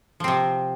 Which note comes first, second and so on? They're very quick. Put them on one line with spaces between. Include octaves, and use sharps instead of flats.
F3 C4 C3